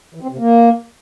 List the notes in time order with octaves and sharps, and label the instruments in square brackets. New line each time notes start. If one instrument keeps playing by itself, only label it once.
[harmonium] E3
C4
C3
A#3